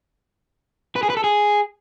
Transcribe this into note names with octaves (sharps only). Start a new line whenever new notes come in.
B4
G#4
B4
A4
G#4